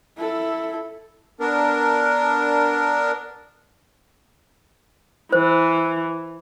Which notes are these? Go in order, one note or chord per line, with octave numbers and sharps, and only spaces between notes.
E4 A4
B3 D4 A#4
E3 C5